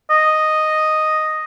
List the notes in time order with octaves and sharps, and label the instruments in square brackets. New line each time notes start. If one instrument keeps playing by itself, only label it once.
[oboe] D#5